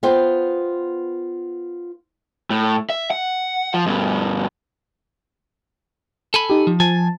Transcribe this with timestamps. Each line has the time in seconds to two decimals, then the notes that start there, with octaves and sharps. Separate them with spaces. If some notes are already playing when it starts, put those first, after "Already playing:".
0.03 B3 F4 C5 G5
2.50 A2
2.90 E5
3.11 F#5
3.74 F3
3.86 G2 B2
6.34 A4 G#5 B5
6.50 D#4 G4
6.67 F3
6.80 F3 G#5 A5